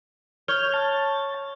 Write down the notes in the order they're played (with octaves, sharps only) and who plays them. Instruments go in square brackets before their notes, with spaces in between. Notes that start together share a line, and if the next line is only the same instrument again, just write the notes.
[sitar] C#5 [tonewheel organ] F6 G6
[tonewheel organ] A5